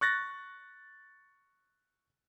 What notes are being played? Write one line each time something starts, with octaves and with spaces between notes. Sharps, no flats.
C#6 F#6 A6 A#6